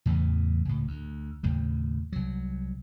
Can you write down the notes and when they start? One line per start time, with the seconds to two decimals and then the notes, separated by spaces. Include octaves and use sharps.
0.06 E2 A2 C#3 E3
0.65 C#2 A2
0.87 D2
1.43 D#2 A2 C#3
2.12 C2 F#3